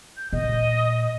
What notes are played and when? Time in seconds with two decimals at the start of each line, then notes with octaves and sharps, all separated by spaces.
0.17 G6
0.33 A#2 D#5